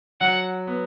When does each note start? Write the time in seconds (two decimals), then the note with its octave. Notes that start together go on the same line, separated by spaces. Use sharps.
0.21 F#3 F#5
0.67 B3